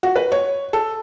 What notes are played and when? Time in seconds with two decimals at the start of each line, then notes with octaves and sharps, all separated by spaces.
0.03 F#4
0.16 B4
0.32 C#5
0.73 A4